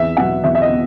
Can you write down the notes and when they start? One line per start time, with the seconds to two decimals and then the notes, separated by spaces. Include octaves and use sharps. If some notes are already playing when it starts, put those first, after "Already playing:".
Already playing: E2 E5
0.17 B2 F#3 B3 F#5
0.44 E2 E5
0.55 E5
0.62 D#5
0.70 B3